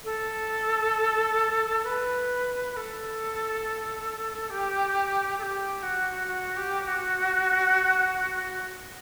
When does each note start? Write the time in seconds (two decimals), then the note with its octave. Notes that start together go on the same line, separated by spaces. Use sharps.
0.04 A4
1.83 B4
2.71 B4
2.76 A4
4.50 G4
5.38 A4
5.42 G4
5.82 F#4
6.27 F#4
6.57 G4
6.87 F#4